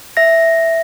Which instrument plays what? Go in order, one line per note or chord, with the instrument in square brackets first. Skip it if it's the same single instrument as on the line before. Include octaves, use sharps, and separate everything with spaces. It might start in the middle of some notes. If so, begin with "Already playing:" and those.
[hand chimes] E5 A#6